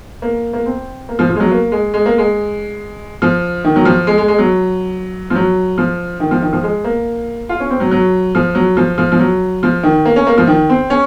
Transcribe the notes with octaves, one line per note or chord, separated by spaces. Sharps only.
A#3
A#3
C4
A#3
F3
F3
G#3
F#3
A#3
G#3
G#3
A#3
G#3
F3
D#3
F#3
F3
G#3
G#3
G#3
F#3
F3
F#3
F3
D#3
F3
D#3
F3
G#3
A#3
F4
C#4
C4
F#3
F#3
F3
F#3
F3
F3
F3
F#3
F3
D#3
A#3
C#4
A#3
F3
D#3
C4
C#4